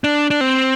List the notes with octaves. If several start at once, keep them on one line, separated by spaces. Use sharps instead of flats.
D4
D4
C4